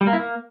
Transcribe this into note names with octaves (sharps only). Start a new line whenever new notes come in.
G3
A#3
E4
A#3